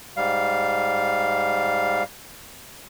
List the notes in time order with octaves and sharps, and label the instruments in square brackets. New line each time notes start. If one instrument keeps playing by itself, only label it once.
[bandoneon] G#2 G3 F5